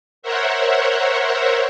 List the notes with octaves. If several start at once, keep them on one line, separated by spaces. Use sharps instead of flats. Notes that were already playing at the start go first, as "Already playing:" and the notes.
A#4 C5 C#5 E5 F#5